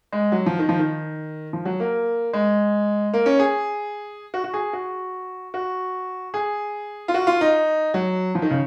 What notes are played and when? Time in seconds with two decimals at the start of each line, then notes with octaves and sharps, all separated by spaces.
0.12 G#3
0.32 F#3
0.46 F3
0.59 D#3
0.69 F3
0.79 D#3
1.53 F3
1.65 F#3
1.80 A#3
2.33 G#3
3.14 A#3
3.26 C#4
3.39 G#4
4.34 F#4
4.44 F#4
4.54 G#4
4.73 F#4
5.54 F#4
6.34 G#4
7.08 F4
7.14 F#4
7.27 F4
7.41 D#4
7.94 F#3
8.35 F3
8.42 D#3
8.51 C#3